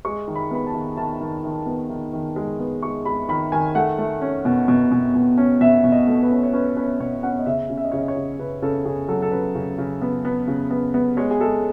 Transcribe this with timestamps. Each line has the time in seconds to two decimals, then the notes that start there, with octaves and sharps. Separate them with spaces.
0.05 G#3 C#6
0.28 D#3
0.35 B5
0.51 B3 B5
0.67 A5
0.74 D#3
0.97 D#3 A5
1.21 D#3
1.44 D#3
1.66 B3
1.90 D#3
2.13 D#3
2.36 G#3
2.59 B3
2.83 G#3 C#6
3.06 G#3 B5
3.29 D#3 B5
3.52 D#3 G#5
3.75 A3 F#5
3.98 A3
4.21 C#4
4.45 B2
4.68 B2
4.92 B2
5.15 B2
5.38 C#4
5.61 B2 E5
5.84 B2
5.92 D#5
6.07 A3
6.22 B4
6.31 C#4
6.43 C#5
6.54 C#4 B4
6.77 C#4 B4
7.00 B2 C#5
7.23 C#4 F#5
7.39 D#5
7.46 C#3 E5
7.70 C#3
7.77 E5
7.85 D#5
7.92 C#3 C#5
7.98 D#5
8.08 C#5
8.16 C#3
8.39 C#3 B4
8.62 C#3 A4
8.85 C#3 G#4
9.08 F#3 A4
9.22 A4
9.31 C#3 B4
9.55 C#3
9.78 C#3
10.02 B3
10.25 B3
10.48 C#3
10.71 B3
10.94 B3
11.17 G#3 C#5
11.31 G#4
11.40 G#3 A4